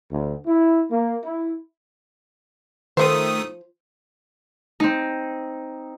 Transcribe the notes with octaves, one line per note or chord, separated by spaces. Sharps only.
D2
E4
A#3
E4
D#3 F3 A3 C5 D#6
C4 D#4